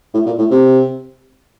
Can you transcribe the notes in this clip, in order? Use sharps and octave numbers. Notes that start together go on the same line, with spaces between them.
A2
A#2
A2
C3